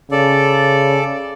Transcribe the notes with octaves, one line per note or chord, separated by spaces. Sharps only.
C#3 A4 D5